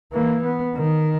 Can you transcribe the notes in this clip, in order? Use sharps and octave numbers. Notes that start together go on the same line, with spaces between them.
E3 A#3
B3
D#3